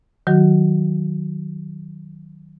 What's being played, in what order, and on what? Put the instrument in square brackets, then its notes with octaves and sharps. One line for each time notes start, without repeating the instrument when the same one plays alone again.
[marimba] D#3 F#3 F#4